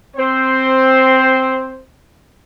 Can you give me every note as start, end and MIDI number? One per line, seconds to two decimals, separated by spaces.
0.17 1.82 60
0.17 1.82 72